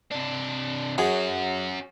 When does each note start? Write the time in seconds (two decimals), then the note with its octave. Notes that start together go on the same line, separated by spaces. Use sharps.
0.11 C3 D4
0.98 F#2 C#4 F#4 G#4